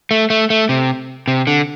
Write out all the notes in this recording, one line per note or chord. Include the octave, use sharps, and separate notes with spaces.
A3
A3
A3
C3
C3
D3